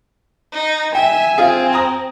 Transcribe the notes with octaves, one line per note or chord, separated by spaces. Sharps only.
D#4
E5 G5 G#5
C4 F4 G#4
G#5 A#5 D#6